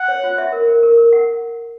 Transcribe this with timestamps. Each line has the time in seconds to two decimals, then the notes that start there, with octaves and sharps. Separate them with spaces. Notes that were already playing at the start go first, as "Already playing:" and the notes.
Already playing: F#5
0.08 C#5
0.23 F4
0.38 E5
0.52 A#4
0.67 A#4
0.83 A#4
0.97 A#4
1.13 F#5